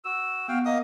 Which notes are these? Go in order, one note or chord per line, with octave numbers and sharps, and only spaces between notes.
F#4 E6
B3 F#4 F5 G5
A#3 D#5 D#6